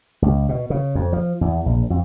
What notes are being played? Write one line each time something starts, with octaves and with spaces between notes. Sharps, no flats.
C#2
B2
C#3
F2
F3
E2
A#1
F2